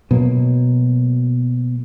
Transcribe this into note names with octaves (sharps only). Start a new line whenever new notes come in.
B2 F#3 A#3